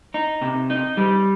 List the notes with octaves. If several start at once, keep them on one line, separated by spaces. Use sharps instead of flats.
D#4
C3
D#4
G3